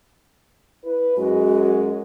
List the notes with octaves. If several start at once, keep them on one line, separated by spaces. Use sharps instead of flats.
E4 B4
F#2 G#3 F#4